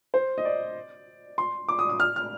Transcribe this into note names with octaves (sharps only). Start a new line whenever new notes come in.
C5
D#5
D5
C6
D6
D#6
D#6
F6
F6